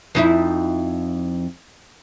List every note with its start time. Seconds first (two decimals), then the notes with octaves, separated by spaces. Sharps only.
0.15 F2 D#4 E4